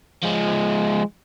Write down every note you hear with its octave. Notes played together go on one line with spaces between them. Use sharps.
F3 G#3